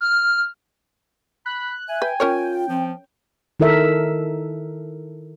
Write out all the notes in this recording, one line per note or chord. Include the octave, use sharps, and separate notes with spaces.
F6
B5 F#6
E5 G#5
B4 G5
C#4 F4 A#4 C#5
F3 C4
D#3 E4 A4 A#4 E5